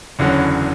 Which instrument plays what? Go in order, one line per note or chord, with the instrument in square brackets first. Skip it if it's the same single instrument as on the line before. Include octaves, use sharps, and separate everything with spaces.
[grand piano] F#1 E2 D3 F#3 C#4